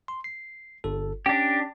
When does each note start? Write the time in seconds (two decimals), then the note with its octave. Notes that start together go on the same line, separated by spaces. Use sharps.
0.08 C6
0.24 C7
0.84 G1 A4
1.26 C#4 D4 G4